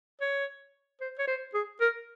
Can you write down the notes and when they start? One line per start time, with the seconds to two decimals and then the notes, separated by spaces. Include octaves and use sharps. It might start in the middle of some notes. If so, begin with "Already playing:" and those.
0.21 C#5
1.01 C5
1.19 C#5
1.27 C5
1.54 G#4
1.81 A#4